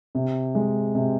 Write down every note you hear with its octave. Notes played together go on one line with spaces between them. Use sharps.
C3
G#3
C3